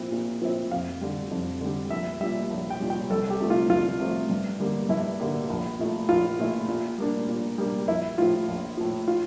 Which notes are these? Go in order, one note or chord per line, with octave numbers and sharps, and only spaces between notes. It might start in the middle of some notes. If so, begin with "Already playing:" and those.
Already playing: A#2 F3 C4 E4
A#2
F3 C4 E4
F2 F5
D3 G3
F2
D3 G3
A#1 E5
A#2 G3 E5
A#1
G5
A#2 G3
G5
C2 A4
G4
C3 F3 A3
F4
C2 F4
C3 F3 A3
G2
D3 G3 A#3
G2 E4
D3 G3 A#3
A#1
A#2 A3 E4
A#1 F4
A#2 A3 E4
A#2
G3 A#3 D4
A#2
G3 A#3 D4
A#1 E4
A2 F3 F4
A#1
A2 F3
F4